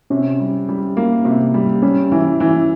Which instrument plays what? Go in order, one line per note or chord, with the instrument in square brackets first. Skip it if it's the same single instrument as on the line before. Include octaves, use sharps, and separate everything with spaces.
[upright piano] C3 [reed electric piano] C#4
[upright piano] G3
G3
A#3
C3
G3
[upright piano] G3 [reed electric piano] C#4
[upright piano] E3
E3